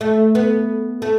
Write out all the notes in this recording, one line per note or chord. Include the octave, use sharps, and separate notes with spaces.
A3
B3
A3